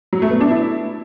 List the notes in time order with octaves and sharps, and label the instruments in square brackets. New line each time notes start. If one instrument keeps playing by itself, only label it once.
[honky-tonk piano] F#3
A3
B3
D4
E4